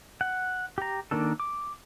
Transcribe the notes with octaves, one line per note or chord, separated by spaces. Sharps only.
F#5
G4 A#5
D#3 A#3 D4 A4
D6